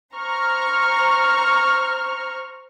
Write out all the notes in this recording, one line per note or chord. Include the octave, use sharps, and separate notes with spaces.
C5 A#5 C#6 F6